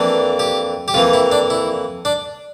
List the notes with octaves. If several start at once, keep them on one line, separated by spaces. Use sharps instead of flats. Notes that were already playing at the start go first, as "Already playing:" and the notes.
Already playing: F2 E3 A#3 D4
G4
G4
F2 E3 A#3 F4
E4
D4
E4
D4